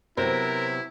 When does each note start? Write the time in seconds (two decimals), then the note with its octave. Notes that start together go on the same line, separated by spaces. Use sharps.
0.17 C3 F#3 B3 E4 A#4 C5